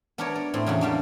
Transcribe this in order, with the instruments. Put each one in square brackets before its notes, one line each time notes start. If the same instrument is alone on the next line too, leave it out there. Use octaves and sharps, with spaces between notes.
[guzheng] B3 D4 A#4 B4 C#5 D5
D5
A2 C4
E2 C#3 F#3 A#3 F#4
C#3 G3 A#3 B3 D4